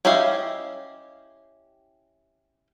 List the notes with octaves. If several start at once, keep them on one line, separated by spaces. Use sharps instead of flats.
C#4 E4 G4 D#5 F5